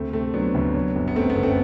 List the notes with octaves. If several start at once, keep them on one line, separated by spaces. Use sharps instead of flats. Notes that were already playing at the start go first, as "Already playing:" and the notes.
Already playing: D2 A3 C4
C3 A3 C4
F#3 B3 D4
D2
F#3
G1
B3
F#2 A3 C4
B3
G1
A3 C4